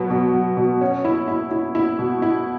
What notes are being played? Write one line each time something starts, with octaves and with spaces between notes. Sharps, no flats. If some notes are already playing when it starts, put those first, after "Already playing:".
Already playing: B2 F#3 B3
B2
F#3
B2
C#4
E4
E4
E4
E4
B2
E4